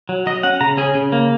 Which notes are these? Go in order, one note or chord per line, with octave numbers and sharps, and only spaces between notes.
F#3
F#3 D#5
C#4 F#5
C#3 A#5
C#4 G#4
C#3
A#3